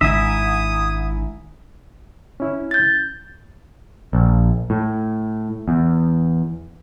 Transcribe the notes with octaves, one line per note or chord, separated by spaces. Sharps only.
G#1 D#3 D4 E4 E5 D#6
C#4 E4
G6 A6
A#1
A2
E2